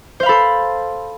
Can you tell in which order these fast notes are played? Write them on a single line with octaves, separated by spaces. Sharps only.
C5 F5 B5 A4 C6